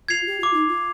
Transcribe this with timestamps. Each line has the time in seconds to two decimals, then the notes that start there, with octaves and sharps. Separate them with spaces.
0.08 F4 G#6 C7 F7
0.27 G4
0.40 F4 D6
0.54 D#4
0.68 F4